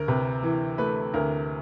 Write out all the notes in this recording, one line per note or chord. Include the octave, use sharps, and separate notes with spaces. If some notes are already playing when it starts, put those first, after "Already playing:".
Already playing: D2 A#4
C3 B4
E3
A3 B4
D2 A#4